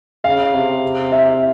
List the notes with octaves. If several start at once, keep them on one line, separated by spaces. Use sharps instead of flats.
C#3 F5
C3
E5